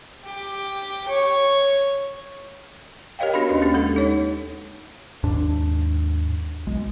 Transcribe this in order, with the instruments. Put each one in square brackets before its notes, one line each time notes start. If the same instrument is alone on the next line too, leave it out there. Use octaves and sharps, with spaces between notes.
[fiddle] G4
C#5
[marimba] G4 A#4 C#5 D#5 F5 G5
B3 D4 F#4 G4 B5
D#2 C#4 B4
A#3 C#4 D4 G4
G#3 A4
D#4 C#5
[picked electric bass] D#2 G#2 D4
B1 G#3